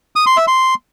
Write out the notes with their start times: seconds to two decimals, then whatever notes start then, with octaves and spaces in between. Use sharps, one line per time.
0.16 D#6
0.26 C6
0.37 E5
0.48 C6